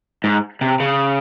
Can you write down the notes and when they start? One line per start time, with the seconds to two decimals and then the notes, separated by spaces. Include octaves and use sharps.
0.24 G#2
0.61 C3
0.80 C#3